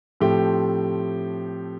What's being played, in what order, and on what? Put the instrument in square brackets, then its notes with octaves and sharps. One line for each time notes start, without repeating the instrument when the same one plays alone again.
[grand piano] A2 F3 A3 C4 G4